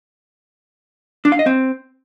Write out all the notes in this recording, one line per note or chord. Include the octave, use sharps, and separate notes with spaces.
D4
F5
D#5
C4